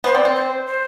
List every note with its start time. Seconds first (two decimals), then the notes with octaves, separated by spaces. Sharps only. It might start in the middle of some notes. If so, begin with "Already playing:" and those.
0.04 B3 C5
0.15 C4 D5
0.25 C4 C5
0.35 C5
0.66 C5